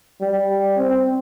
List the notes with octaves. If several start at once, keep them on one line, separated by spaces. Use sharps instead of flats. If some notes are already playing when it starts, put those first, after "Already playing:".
G3
C4